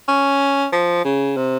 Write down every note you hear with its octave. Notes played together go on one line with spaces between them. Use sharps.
C#4
F3
C#3
C3